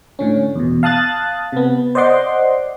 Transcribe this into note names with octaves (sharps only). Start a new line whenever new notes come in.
A2 D3 C#4
E2 B2
F5 A5 D#6 F#6 A6
C3 B3
C5 D5 D#5 F#5 C6 D6